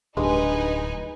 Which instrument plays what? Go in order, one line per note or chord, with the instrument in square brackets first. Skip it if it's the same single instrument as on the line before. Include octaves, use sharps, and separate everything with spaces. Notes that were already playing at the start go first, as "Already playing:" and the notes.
[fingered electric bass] D1 [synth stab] G2 G#3 [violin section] D#4 B4 G#5